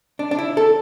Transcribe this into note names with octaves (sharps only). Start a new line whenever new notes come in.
D4
D4
E4
A4